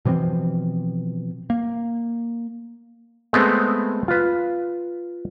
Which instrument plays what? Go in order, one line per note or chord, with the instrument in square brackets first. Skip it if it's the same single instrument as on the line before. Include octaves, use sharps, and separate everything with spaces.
[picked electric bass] B2 E3 F3 C4
A#3
[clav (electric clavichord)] G#3 A3 B3 C4
F4 B4